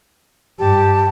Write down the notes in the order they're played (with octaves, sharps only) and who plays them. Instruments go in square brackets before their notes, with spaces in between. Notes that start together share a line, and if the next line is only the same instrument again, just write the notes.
[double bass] G2 [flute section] G4 A5